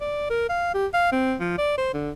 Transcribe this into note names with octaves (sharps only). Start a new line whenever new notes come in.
D5
A#4
F5
G4
F5
C4
F3
D5
C5
D3